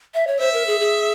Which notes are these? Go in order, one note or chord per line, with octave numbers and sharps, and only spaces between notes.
E5
C#5
C5 E5
A#4
G#4
G#4